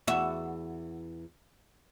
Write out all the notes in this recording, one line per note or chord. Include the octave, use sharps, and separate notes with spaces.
E2 F#4 E5